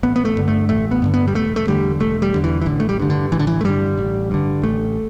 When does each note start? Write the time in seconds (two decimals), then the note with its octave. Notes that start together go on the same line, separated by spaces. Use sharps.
0.03 A1 B3
0.16 B3
0.25 A3
0.37 G2 D3
0.48 A3
0.69 A1 A3
0.91 B3
1.02 G2 D3
1.14 B3
1.28 G3
1.34 E1 A3
1.56 A3
1.67 E2 D3 G3
2.00 E1 A3
2.22 G3
2.34 E2 D3
2.44 E3
2.62 E3
2.66 A1 D3
2.80 A3
2.89 G3
3.00 G2 D3
3.10 D3
3.32 A1 E3
3.39 D3
3.47 E3
3.61 A3
3.64 G2 D3 G3
3.98 A1
4.31 G2 D3
4.64 A1 A3